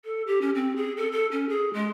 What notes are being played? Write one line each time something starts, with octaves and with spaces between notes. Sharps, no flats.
A4
G4
C#4
C4
G#4
A4
A4
C#4
G#4
G#3